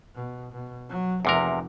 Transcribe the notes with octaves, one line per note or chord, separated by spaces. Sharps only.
B2
B2
F#3
F1 E2 C3 A#4